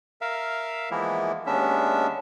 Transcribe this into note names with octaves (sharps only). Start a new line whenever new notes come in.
A#4 E5 F5
E3 F3 G#3 A#3 B3 E4
D#2 G#3 B3 C#4 D4 E5